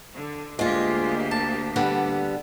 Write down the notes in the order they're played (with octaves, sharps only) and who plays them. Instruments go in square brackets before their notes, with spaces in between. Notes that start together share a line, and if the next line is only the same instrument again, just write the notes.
[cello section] D3
[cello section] D2 A#3 G4 [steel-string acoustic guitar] G#3 F4
[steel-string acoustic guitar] A5
D3 G3 B3